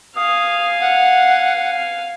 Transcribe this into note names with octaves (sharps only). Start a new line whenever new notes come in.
F5 G#5 D#6
F#5